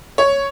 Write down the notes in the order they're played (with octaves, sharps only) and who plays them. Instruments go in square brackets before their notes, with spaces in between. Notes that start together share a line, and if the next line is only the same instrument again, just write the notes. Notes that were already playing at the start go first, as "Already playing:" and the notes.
[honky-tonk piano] C#5